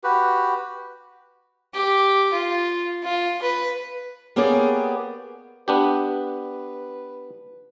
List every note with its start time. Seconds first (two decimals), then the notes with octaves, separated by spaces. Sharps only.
0.04 F#4 G4 B4
1.74 G4
2.32 F4
3.04 F4
3.42 B4
4.36 A#3 B3 C#4 G4 G#4 D5
5.68 B3 D4 G4 B4